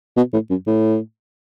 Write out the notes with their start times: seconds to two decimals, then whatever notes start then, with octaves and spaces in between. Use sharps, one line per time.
0.17 B2
0.33 A2
0.50 F#2
0.67 A2